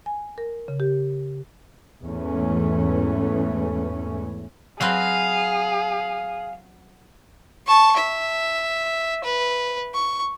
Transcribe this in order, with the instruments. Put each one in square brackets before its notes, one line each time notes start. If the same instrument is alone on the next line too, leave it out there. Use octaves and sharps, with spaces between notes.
[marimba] G#5
A#4
C#3
G4
[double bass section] E2 G#2 E3 A3 C#4
[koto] F#3 C4 B4 [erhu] G#4 [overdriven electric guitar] F5
[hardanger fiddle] A5 C#6
E5
B4
C#6